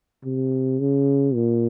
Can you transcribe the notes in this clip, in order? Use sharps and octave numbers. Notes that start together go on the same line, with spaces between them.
C3
C#3
A#2